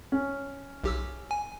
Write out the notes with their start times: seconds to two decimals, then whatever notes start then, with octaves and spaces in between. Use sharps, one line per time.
0.12 C#4
0.84 B1 G4 E6
1.31 G#5